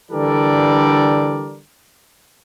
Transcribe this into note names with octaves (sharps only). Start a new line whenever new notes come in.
D3 E3 G3 A4 A#4 D5